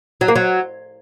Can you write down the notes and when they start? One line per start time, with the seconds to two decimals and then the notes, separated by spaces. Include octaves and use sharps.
0.21 F#3
0.28 A#3
0.36 F#3